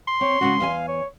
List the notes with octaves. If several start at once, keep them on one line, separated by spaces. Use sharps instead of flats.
C6
C4 C#5
C#3 G#3 C#4 F#4
E2 D#5 F5 G#5
C#5